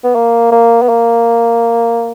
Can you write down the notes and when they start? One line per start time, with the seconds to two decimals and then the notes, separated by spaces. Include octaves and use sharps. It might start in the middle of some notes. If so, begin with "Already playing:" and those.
0.04 B3
0.15 A#3
0.52 A#3
0.83 B3
0.89 A#3